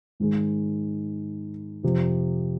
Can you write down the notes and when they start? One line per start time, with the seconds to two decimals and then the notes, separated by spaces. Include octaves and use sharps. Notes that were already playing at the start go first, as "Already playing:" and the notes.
0.20 G#2 D#3 G#3
1.83 F2 C3 F3